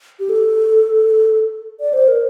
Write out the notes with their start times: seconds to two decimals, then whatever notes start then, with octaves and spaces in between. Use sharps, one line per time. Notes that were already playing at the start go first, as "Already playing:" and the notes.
0.19 G4
0.29 A4
1.80 D5
1.93 C5
2.08 A#4